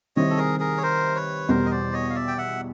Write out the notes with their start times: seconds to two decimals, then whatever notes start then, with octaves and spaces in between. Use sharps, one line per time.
0.16 C3 D#3 G3 C4 E4 C#5 D#5
0.30 A4
0.38 G#4 A#4
0.60 G#4 A#4
0.77 C#5
0.83 A#4 C5
1.15 B4 C#5
1.48 E2 B2 G3 A#4 C5
1.66 D#5
1.71 C5 D5
1.93 C#5 D#5
2.10 F5
2.15 D5 E5
2.28 G5
2.38 E5 F#5